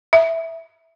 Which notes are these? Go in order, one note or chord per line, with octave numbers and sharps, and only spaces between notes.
E5